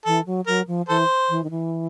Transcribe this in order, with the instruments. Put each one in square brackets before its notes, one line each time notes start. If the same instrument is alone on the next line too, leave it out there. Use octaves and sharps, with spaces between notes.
[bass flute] E3 [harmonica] A4
[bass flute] F#3
[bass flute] F#3 [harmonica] A#4
[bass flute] F3
[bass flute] E3 [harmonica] A4 C5
[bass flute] E3
D#3
E3